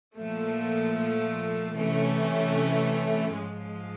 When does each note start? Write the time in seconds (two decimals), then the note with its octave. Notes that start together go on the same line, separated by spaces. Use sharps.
0.17 A#2 F3 A3
1.76 C3 E3 A3 C#4
3.35 G#2 F3 G#3